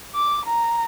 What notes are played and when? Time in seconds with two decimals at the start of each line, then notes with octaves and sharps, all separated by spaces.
0.15 D6
0.46 A#5